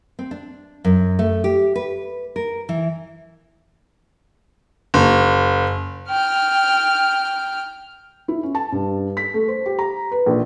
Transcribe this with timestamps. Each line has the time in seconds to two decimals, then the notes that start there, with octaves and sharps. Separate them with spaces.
0.19 C4
0.31 D4
0.84 F#2
1.19 A3
1.44 G4
1.76 B4
2.36 A#4
2.69 E3
4.94 F#1
6.09 G5 F6
8.28 E4
8.43 C#4
8.55 A5
8.72 G2
9.17 B6
9.34 A3
9.48 C5
9.66 G4
9.79 A#5
10.11 B4
10.26 A#1